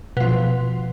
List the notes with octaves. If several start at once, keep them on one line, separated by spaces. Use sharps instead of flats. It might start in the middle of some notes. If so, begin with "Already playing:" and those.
B2 F3